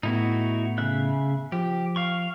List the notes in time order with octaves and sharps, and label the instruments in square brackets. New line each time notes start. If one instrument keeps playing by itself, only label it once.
[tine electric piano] A2 A3 B3 [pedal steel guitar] D#4 E4 F#4
[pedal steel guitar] C#3 E5 F#6
[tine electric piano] F3 [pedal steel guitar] G4
[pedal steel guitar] F5 C#6